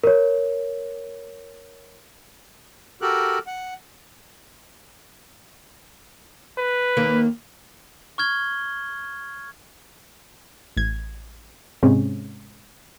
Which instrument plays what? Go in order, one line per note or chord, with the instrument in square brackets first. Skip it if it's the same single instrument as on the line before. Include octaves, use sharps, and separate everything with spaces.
[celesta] A#4 C#5
[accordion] F#4 G4 A4 A#4 F#6
F#5
[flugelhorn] B4
[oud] D#2 D#3 A#3
[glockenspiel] C#6 F6 G#6 G7
[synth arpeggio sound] A1 G#6
G#2 C3 G#3 C4 C#4